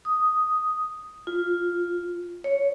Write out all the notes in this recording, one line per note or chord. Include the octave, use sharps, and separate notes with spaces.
D#6
F4
C#5